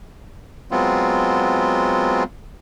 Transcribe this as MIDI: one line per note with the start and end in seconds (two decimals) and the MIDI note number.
0.71 2.23 54
0.71 2.23 56
0.71 2.23 59
0.71 2.23 60
0.71 2.23 65